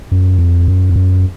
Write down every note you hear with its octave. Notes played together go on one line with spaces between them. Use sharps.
F#2
F2
F#2
F2
F#2